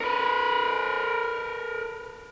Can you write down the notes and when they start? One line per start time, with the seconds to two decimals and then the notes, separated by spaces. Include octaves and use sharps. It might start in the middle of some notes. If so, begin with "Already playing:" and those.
0.01 A#4 B4